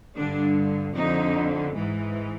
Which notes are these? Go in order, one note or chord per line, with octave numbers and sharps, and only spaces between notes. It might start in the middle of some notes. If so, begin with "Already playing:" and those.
G2 D3 D4
F2 D3 D#4
G#2 E3